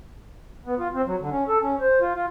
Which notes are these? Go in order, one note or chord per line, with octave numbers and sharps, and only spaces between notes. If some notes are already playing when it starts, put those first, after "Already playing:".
B3
F4
C4
F#3
D3
C#4
A4
C#4
C5
F4
F4